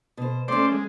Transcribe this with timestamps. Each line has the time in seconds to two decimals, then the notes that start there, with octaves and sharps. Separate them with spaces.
0.17 B2 C5
0.48 A3 C#4 C5 D5
0.72 G#3